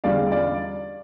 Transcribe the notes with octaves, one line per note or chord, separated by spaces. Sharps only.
E2 D3 G3 C#4 F4 D5 F5
D5 F5